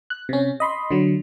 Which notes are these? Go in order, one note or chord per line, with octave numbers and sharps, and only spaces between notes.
F#6
C3 C#4
D#5 B5 C6
D3 F#3